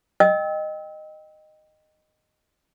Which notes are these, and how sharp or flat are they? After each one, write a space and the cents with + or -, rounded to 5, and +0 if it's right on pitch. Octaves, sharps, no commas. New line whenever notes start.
D#5 -10 G5 +0 E6 -30